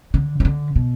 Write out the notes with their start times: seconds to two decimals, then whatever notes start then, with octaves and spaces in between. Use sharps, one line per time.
0.14 D3
0.40 D#3
0.45 D3
0.76 B2